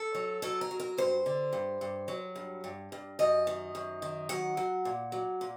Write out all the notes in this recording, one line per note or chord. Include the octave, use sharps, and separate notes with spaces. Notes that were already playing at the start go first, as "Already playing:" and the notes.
Already playing: A4
F#3
F#3 A4
A#4
F#3
A#4
G2 C5
D3
G2
G2
F#3
G2
G2
G2
F#2 D#5
D#3
F#2
D#3
F#3 F#5
F#3
A#2
F#3
A#2